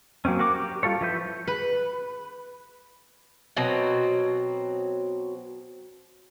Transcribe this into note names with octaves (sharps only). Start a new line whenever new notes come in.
F#3 A#3 C4 C#4
F#4 A#4 D6
G4
G3 F4 A4 C#5
F3 E4 B4 G6
B4
B2 F#3 C4